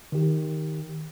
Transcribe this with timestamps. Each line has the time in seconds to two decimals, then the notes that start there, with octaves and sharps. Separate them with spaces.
0.12 D#3 G4